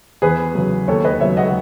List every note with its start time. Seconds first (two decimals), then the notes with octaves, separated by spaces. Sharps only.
0.22 E2 G#4 B4
0.55 C#3 F#3
0.88 D#2 A4 C#5
1.05 B4 D#5
1.20 C#3 F#3 C#5 E5
1.37 D#5 F#5